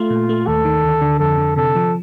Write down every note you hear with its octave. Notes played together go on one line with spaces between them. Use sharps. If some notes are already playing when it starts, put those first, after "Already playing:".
Already playing: A3 F4
A#2
A3
D#2 A4
D#3
D2
D3
F2 A4
D3
C3 A4
F3